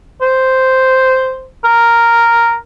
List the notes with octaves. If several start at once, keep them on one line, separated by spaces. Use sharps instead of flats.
C5
A#4